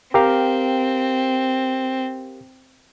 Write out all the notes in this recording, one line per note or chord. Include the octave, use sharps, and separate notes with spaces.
C4 G4 A#4 F5